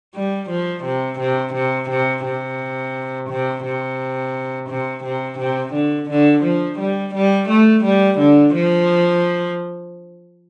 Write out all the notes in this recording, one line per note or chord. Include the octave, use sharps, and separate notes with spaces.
G3
F3
C3
C3
C3
C3
C3
C3
C3
C3
C3
C3
D3
D3
F3
G3
G3
A3
G3
D3
F3